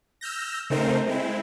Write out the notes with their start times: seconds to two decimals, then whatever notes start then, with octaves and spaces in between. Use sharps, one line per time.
0.21 E6 F6 G6 A#6
0.70 C#3 A3 C4 D#4 A#4 C5
1.07 G#3 C4 E4